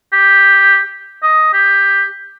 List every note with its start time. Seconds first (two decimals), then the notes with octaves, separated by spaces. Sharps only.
0.13 G4
1.23 D#5
1.53 G4